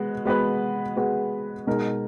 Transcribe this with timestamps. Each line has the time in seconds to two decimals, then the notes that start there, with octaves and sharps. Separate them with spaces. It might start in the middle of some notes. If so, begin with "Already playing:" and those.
Already playing: G#3 B3 F#4
0.25 G#3 B3 F#4 B4
0.96 G#3 B3 F#4 B4
1.67 B2 G#3 D#4 A#4